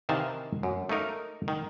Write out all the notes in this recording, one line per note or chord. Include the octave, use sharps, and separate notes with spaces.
C3 D#3 E3 F5 A5
F#2
A3 A#3 D#4 A#4
D#3